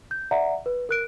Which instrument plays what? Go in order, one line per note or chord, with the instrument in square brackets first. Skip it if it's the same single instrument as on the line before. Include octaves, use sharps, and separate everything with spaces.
[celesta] G6
D5 E5 F#5 A#5
B4
A#4 F#6 D7